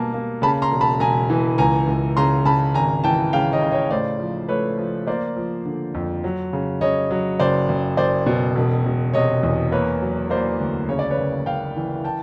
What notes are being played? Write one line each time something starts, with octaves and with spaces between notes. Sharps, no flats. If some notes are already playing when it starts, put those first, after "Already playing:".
Already playing: B2 G3 A#3 G#5 A5
A#3
C#3 A5 B5
A#5 C6
E1
A5 B5
E1 G#5 A#5
E3
C#2 G#5 A#5
C#2
C#3 A#5 C6
C#3 A5 B5
G#1 G#5 A#5
E3 G5 A5
C#3 F5 G5
C#5 D#5
C#3
C#5 D#5
A2 C5 D5
F3
A3 B4 C#5
F3
A#3 C5 D5
F3
D3
F2
F#3
C#3
C#3 C#5 D#5
F#3
F#1 C5 D5
F#1
F#1 C5 D5
B2
E1
E1
C3 C#5 D#5
E2
A#3 B4 C#5
F#3
A#3 C5 D5
D2
C#3 C#5
D5
B4 C#5
F#1
F#1 F5 G5
E3
G5 A5